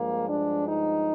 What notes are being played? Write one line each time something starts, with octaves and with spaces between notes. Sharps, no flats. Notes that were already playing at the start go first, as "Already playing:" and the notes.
Already playing: G2 F3 G#3 A#3
D4
D#4